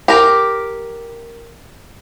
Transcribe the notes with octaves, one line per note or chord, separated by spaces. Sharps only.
G4 A#4